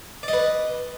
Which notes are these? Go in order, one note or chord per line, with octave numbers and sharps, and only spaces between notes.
B4 D5 D#5